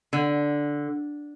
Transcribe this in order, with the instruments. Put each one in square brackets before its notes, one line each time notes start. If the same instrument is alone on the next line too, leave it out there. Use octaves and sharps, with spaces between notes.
[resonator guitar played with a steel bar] D3